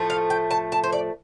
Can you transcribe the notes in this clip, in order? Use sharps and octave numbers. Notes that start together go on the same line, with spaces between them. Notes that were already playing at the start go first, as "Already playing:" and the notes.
Already playing: A2 F3 A3
F5
G5
A5
A5
C5
D5